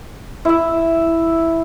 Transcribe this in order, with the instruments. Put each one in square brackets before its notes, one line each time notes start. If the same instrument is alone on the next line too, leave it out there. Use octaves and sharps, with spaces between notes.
[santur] E4 E5